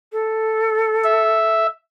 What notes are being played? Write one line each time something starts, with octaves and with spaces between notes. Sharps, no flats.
A4
E5